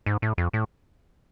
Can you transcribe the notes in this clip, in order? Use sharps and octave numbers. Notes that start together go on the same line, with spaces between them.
G#2
A2
F2
A2